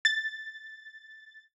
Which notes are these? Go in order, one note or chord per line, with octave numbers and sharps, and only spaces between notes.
A6